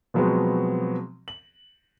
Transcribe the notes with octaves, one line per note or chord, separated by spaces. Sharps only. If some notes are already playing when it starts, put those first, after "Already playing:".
B2 F3 F#3 G#3 B3 C4
F#7